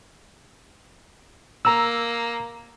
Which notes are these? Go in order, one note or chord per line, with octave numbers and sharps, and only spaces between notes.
A#3 A#5 E6